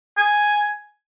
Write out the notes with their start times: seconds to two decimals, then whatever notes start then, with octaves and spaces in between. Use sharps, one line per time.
0.18 G#5